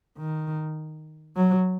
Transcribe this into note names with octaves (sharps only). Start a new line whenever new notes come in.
D#3
F#3